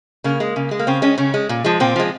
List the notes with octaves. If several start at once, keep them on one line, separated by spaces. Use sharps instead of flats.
C#3 A#3
G#3
C#3
G#3
A#3
C#3 C4
G#3 C#4
C#3 C#4
G#3
A#2
F3 G#3
A#2 C4
F3 G#3